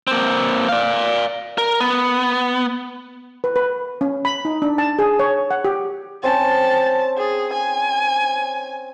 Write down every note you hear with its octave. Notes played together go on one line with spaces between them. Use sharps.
A#3 C4
D5 F5
A#4
B3
B4
B4
C#4
B5
D#4
D4
A5
G#4
C#5
F#5
G4
C4 C#4 G5 A5
G#4
G#5